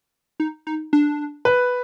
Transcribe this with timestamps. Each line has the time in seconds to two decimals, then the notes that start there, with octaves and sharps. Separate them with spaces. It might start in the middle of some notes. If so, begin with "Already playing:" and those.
0.40 D#4
0.67 D#4
0.93 D4
1.45 B4